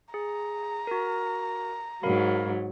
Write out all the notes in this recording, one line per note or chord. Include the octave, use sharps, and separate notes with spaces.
G#4 A#5
F#4 A#4
G#2 F#3 A#4 F5 B5